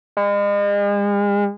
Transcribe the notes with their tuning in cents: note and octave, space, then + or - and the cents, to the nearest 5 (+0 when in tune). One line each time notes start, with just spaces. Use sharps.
G#3 -40